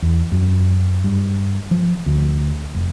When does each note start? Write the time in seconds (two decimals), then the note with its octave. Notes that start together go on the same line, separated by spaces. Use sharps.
0.02 E2
0.32 F#2
1.04 G2
1.71 F3
2.06 D2
2.75 F1